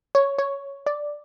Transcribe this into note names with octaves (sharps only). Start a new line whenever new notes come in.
C#5
C#5
D5